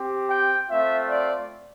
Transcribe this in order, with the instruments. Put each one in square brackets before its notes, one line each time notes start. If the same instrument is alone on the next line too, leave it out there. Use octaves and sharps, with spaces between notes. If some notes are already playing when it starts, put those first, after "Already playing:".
Already playing: [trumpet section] C4 G4
G5
A3 C4 F4 E5
D5